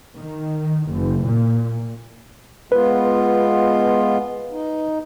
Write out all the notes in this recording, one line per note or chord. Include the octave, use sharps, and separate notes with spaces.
D#3
F#1
A#2
G#3 B3 F4 B4
D#4